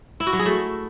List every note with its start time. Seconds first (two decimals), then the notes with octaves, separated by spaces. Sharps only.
0.20 E4
0.27 F#4
0.33 F#3
0.39 G#4
0.46 A3